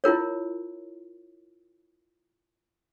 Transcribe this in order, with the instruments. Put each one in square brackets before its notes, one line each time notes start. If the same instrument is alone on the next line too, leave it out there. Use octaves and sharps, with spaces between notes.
[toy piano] E4 F4 A#4 C#5